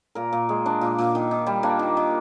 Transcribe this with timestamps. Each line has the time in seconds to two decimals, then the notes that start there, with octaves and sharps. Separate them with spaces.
0.15 A#2 A#4
0.32 A#2
0.49 G#3
0.66 D4
0.81 A#2
0.98 A#2
1.15 D#3
1.31 D#3
1.46 G3
1.63 A#3 D4
1.79 D#3
1.97 D#3